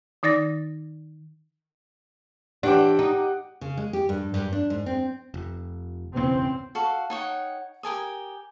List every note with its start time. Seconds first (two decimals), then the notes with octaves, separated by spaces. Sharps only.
0.23 D#3 D#4 D5 A6 A#6
2.63 E3 D4 G4 F#5 G5 D6
2.99 D#4
3.61 C#3
3.77 G#3
3.93 G4
4.09 G2
4.34 G2
4.52 D4
4.70 G#2
4.86 C4
5.34 F1
6.16 E1 C#3 E3 C4
6.75 F#4 A4 F5
7.10 D#4 C#5 F#5 G5
7.83 G4 A#4 G#5 D#6